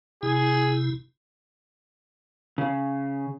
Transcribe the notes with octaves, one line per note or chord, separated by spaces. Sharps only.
C3 E4 G#4
C#3